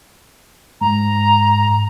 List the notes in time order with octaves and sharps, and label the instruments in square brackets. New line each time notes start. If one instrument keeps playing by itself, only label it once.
[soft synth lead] G#2 [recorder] A#5